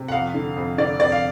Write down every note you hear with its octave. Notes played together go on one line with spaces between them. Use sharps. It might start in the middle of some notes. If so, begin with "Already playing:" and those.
Already playing: C3
F#5
F2 F5
D3
F2
D3 D5
F2 D5
F5